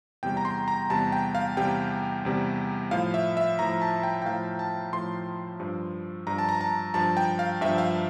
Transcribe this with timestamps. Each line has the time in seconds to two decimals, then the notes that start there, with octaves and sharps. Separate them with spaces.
0.23 E2 C3 G3 G5
0.37 A#5
0.45 C6
0.68 A#5
0.90 E2 C3 G3 A5
1.12 G5
1.35 F5
1.57 E2 C3 G3 G5
2.25 E2 C3 G3
2.91 A2 F3 F5
3.14 E5
3.37 E5
3.59 A2 F3 A#5
3.82 A5
4.03 G5
4.22 G5
4.25 A2 F3 F5
4.59 A5
4.93 A2 F3 C6
5.60 G2 F3
6.27 G2 F3 A#5
6.38 A5
6.49 A#5
6.61 A5
6.94 G2 F3 A5
7.17 G5
7.39 F5
7.61 G2 F3 E5
7.78 F5